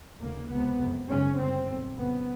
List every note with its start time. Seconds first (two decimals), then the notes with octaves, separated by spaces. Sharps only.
0.20 F1 D#2 C#3 A#3
0.49 C#2 C3 B3
0.78 F#1 F2 C3
1.08 G#1 F#2 C#3 C#4
1.37 G1 F#2 C#3 C4
1.67 B1 A#2
1.95 F#1 F2 C#3 B3